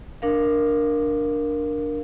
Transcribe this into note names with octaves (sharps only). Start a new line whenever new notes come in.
D4 A#4 F5